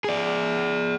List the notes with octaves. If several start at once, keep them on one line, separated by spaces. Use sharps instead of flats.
G#4 D5